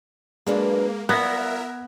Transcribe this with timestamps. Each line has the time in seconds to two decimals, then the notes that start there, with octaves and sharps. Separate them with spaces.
0.47 F#3 G#3 A#3 D4 B4
1.09 G3 B3 F4 A#4 E5 F#6 G#6 A#6